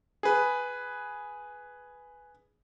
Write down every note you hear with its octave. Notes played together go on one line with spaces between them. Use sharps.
G#4 B4